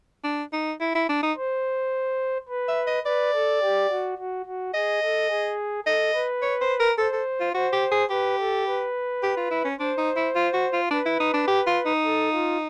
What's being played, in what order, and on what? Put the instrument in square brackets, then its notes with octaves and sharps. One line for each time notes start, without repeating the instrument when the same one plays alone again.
[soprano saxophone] D4
D#4
E4
E4
D4
D#4
[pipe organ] C5
B4
[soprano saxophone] E5
D#5
[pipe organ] B4 [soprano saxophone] D5
[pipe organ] A4
G4
F#4
F#4
F#4
[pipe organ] G#4 [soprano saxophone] D#5
[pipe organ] A4
G#4
[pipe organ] A4 [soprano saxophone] D#5
[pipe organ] B4
[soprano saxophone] C#5
C5
A#4
[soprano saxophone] A4 [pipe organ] C5
[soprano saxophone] A4
F4
[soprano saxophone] F#4 [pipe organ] C5
[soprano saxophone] G4
G#4
[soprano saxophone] G4 [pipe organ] B4
[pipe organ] A4
B4
[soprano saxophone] G4
F4
E4
C#4
[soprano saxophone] D4 [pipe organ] C5
[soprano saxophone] D#4
E4
F4
F#4
F4
[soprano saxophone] D4 [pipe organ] B4
[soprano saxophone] E4
D#4
D4
G4
F4
D#4
[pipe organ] A4
F4